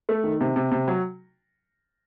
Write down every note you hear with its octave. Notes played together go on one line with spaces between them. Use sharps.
A3
D#3
C3
C3
C3
F#3